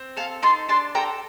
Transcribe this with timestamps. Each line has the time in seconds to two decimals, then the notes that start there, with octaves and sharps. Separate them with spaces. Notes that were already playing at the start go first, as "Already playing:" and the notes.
Already playing: C4
0.17 A4 F5 A5
0.42 D#4 A5 C6
0.69 D4 A5 C6
0.95 A4 G5 A#5